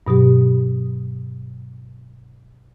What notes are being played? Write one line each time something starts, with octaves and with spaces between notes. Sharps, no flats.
G2 B2 F#3 G4